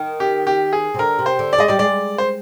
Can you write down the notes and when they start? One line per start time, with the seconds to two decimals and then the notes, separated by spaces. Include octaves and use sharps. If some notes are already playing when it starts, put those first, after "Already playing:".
Already playing: D#3
0.20 G4
0.47 G4
0.73 G#4
0.94 C3
0.99 D3 A#4
1.19 C3
1.26 C5
1.39 D3
1.53 D5
1.58 G#3 D#5
1.68 G3 D5
1.79 G#3 D5
2.18 C5